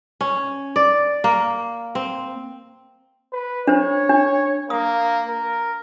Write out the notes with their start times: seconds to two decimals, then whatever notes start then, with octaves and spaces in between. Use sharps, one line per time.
0.21 C#4
0.76 D5
1.24 A#3
1.95 C4
3.33 B4
3.67 D4 C5 C#5
4.09 D4
4.70 A#3 D#6
5.29 A#4